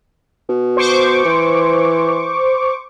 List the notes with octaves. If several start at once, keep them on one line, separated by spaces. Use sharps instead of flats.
B2
C5 C#6 D6
E3